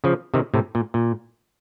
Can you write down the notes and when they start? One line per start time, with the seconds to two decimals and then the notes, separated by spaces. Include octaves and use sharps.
0.04 C#3 F3
0.34 C3 D#3
0.54 A2 C3
0.75 A#2
0.94 A#2